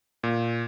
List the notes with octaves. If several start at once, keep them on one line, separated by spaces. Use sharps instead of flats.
A#2